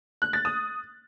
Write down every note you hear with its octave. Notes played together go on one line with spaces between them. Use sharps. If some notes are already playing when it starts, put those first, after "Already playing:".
F#6
A6
D#6